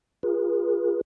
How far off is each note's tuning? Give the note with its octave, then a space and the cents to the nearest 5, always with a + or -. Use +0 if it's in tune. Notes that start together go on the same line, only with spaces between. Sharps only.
F4 +0 G#4 -25 B4 -45